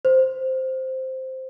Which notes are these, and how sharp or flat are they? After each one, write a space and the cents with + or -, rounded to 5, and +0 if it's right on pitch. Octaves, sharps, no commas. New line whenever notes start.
C5 +0